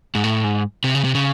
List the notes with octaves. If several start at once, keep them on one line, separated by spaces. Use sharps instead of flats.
G#2
A2
G#2
C3
C#3
C3
C#3